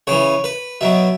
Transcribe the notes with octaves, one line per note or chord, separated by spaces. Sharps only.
C#3 E3 C#5
B4
B2 F#3 E5